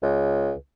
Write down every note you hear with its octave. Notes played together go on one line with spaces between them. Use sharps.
C#2